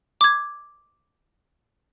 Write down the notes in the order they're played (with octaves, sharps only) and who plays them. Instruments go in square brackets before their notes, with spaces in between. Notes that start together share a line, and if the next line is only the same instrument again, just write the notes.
[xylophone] D6 G#6